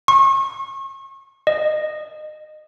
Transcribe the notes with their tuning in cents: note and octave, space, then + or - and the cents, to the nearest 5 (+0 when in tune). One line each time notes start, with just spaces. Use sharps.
C#6 -35
D#5 -20